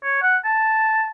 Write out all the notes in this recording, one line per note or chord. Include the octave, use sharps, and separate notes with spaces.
C#5
F#5
A5